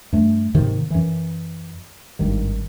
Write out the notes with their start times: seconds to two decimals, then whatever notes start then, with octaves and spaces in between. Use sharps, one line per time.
0.12 G2 A3
0.54 G#2 C3 D#3 A#3
0.90 F#2 E3
2.19 G#1 G2 D#3